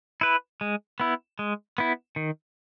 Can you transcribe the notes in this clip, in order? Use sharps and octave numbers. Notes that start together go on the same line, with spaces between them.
E4 B4
G#3
B3 E4
G#3
B3 E4
D#3